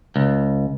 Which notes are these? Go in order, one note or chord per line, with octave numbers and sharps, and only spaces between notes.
C#2